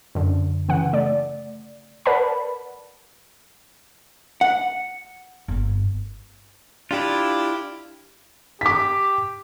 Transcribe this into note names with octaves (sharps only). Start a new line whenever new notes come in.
F#2 D3
C#3 E3 F#5
A3 D5
A#4 B4 D5 F#5 A5 B5
F#5
G1 A#3
D4 E4 F4 G4 D5
G4 D6 B6